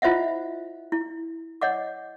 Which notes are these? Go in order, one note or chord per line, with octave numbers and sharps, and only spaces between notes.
E4 F4 C5 D#5 E5 F#5
E4
C#5 D#5 F#5 D6